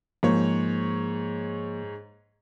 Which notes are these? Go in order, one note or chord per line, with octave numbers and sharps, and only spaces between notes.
G#2 F3 A#3 C#5